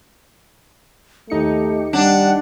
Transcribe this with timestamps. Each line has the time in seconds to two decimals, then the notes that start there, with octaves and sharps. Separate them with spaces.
1.30 D#2 A3 D#4 G4 C#7
1.93 G3 D4 F#5